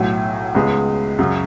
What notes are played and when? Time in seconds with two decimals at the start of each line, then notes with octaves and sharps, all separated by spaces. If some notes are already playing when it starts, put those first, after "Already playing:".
Already playing: B1 A2 F#3
0.55 C#2 C#3 G#3 B3
1.19 F#2 C#3 F#3